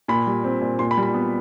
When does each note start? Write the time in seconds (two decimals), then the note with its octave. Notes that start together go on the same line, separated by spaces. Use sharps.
0.08 A#2 B5
0.27 G3
0.44 C4
0.61 A#2
0.79 A#2 C6
0.91 B5
0.97 G3
1.03 B5
1.14 B3